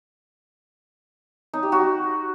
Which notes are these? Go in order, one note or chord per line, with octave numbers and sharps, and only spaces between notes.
D#4
G4
F#4